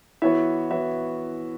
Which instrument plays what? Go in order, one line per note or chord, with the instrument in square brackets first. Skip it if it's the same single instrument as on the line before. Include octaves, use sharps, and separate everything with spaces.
[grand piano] E3 B3 F#4 C#5 E5 [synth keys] E4
[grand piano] E3 B3 F#4 C#5 E5 [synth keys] E4